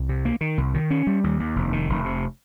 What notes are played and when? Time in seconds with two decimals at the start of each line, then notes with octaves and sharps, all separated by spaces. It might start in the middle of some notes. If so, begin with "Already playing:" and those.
Already playing: C2
0.09 C3
0.25 A#3
0.41 D#3
0.58 C2
0.74 D#3
0.90 C#4
1.07 G3
1.24 D#2
1.40 D#2
1.56 F1
1.73 D#3
1.89 F1
2.05 C3